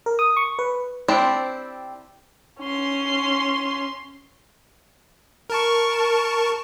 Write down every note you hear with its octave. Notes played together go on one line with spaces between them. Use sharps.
A#4
D#6
C#6
B4
C4 D4 E4 G4 C5
C#4 C6
A#4 A5 C#6